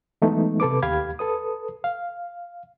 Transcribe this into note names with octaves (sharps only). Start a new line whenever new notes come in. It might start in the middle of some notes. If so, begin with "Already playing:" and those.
E3 F#3 G#3 A3 B3 D#4
C3 A4 B4 D6
D#2 G4 F5 B5 G#6
A4 B4 D#6
F5